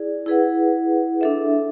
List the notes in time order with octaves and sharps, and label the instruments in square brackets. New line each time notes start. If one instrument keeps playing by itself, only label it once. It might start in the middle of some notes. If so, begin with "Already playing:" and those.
Already playing: [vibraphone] E4 G#4 D5
E4 G#4 B4 F#5
D4 A4 E5